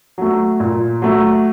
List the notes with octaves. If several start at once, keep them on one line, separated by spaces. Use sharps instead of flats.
F#3 A3
A#2
F#3 A3